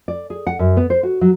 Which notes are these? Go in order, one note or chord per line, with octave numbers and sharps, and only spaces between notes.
D5
G#4
F#5
F#2
B3
C5
F#4
F#3